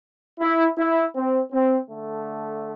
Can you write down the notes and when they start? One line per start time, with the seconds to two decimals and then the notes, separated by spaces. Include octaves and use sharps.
0.40 E4
0.77 E4
1.14 C4
1.51 C4
1.88 D3 A3